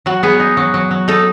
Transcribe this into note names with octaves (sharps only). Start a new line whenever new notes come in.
F#3 F#4
B3 G#4
D#4
F#3
F#3
F#3
D#4 A4